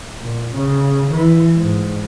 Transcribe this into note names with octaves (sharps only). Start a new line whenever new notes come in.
A#2
C#3
E3
G#2